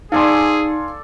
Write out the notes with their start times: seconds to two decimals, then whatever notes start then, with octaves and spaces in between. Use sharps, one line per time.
0.12 D#4 G#4 A4 D5 F5 G#5 C6